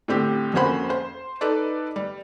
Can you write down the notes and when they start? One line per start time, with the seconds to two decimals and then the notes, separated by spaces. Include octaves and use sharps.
0.08 A2 D3 C4 G4
0.54 F2 A#3 C#4 F#4 C5 B5
0.90 C5
1.41 D#4 A4 B4 D5
1.96 G3